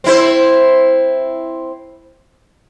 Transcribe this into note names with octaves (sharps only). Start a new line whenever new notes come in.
C4 E4 C5